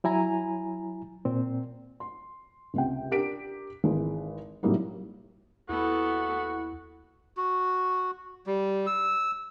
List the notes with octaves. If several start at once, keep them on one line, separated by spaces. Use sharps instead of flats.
F#3 E4 G#5 A#5
A#2 C4
C6
C#2 C3 G5
D4 G4 A#4 B6 D7
G#1 E3 G#3
A2 C3 F#3 G3 A#3 D#4
D#2 B3 E4 F#4 A4
F#4
G3
E6